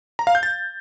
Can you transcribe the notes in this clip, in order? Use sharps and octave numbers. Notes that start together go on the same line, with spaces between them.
A#5
F5
G6
A6